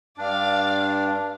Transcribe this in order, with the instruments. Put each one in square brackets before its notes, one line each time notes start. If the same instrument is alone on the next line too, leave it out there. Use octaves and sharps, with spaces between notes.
[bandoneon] G2 D4 [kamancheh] D5 F5